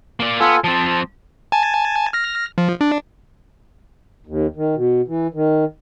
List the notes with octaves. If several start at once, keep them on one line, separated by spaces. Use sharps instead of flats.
A#3 D5
B3 F4 A4 G#5
F3 C4 A5
G#5 A5
F6 A#6
F3
D4
D#2
D#3
B2
E3
D#3